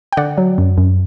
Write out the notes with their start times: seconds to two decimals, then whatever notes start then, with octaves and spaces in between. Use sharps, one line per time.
0.12 G5
0.17 D3 D5 F#5
0.38 F#3
0.58 F#2
0.78 F#2